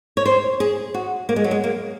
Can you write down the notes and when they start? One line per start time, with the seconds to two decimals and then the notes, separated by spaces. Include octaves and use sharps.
0.17 C#5
0.26 C5
0.60 G#4
0.94 F#4
1.29 A#3
1.36 G#3
1.44 F#3
1.51 G#3
1.64 A#3